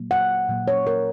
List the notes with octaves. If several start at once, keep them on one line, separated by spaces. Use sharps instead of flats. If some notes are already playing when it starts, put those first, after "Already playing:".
Already playing: A#2 F#3 A#3
F#5
A#2 F#3 A#3
C#5
A#4